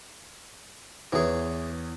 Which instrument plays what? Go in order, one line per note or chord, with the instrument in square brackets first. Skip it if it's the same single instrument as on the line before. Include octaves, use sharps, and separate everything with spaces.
[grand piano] E2 C#5 [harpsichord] E3 G#4